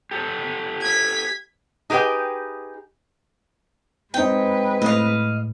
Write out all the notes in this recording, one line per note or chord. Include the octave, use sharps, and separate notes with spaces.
G4 A4
G#6 B6
D#4 G4 G#4 B4 G5
G#3 C4 D#4 B4 G5
A2 D#5 F5